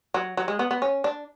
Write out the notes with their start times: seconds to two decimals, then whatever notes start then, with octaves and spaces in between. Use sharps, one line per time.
0.14 F#3
0.37 F#3
0.48 G#3
0.59 B3
0.71 B3
0.82 C#4
1.04 D4